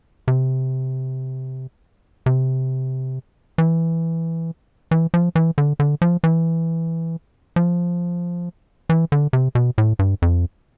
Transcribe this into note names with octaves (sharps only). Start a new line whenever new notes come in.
C3
C3
E3
E3
F3
E3
D3
D3
F3
E3
F3
E3
D3
C3
B2
A2
G2
F2